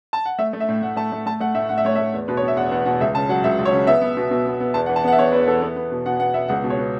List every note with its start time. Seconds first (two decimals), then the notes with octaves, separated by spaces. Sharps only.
0.13 A5
0.26 F#5
0.38 A3 E5
0.53 A3
0.60 E5
0.68 A2
0.82 A2 F#5
0.96 A3 A5
1.12 A3
1.26 A3 A5
1.40 A3 F#5
1.55 A2 E5
1.69 A2 F#5
1.78 E5
1.85 A3 C#5
1.95 A3 E5
2.14 E2
2.28 B2 B4
2.37 C#5
2.42 B3
2.48 E5
2.56 E2 F#5
2.71 E2 F#5
2.86 B2 F#5
3.00 C#2 E5
3.15 C#3 A5
3.29 F#3 F#5
3.44 C#2 E5
3.59 C#2
3.65 C#5
3.72 C#3
3.87 B3 E5
4.01 B3
4.17 B2
4.31 B2
4.46 B3
4.60 B3
4.74 E2 A5
4.86 F#5
4.89 E3
4.96 A5
5.04 B3 F#5
5.12 E5
5.18 E2 C#5
5.32 E2 B4
5.48 E3 A4
5.62 B3
5.76 B3
5.91 B2
6.06 B2 F#5
6.19 B3 F#5
6.34 B3 E5
6.48 C#2 F#5
6.64 B2
6.70 C#5
6.77 B3